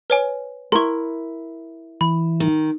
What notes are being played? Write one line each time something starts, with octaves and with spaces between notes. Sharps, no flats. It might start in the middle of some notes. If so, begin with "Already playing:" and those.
B4 C#5 G#5
E4 A#4 C6 C#6
E3 B5
D#3